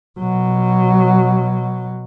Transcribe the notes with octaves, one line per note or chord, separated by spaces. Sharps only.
B2 F#3